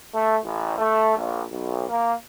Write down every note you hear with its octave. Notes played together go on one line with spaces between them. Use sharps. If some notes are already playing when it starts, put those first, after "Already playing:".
A3
A1
A3
A#1
B1
A#3